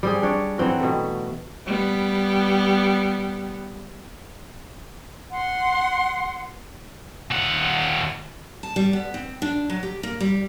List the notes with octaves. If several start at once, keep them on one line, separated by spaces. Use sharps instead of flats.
G3 C4 G#4
D4 C#5 D5
E3 F#3 C4 F#4
B2 A3
G3 B3
F#5 C6
D#2 F#5
A5
G3
B3
C4
D4
F#3
G4
A#3
G3